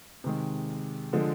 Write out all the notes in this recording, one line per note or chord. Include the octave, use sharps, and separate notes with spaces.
C3 D#3 G#3
D3 F3 G#3